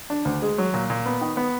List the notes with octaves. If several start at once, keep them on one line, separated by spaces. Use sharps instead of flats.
D4
D2
G#3
F#3
A#2
A#2
B3
D#3
B3